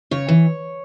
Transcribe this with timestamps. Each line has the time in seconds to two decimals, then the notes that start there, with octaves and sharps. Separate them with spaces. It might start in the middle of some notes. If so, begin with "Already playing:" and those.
0.11 C#3 C#5
0.29 E3